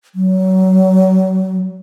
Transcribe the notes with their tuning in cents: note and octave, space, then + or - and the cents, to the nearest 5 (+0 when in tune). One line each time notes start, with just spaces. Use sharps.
F#3 +25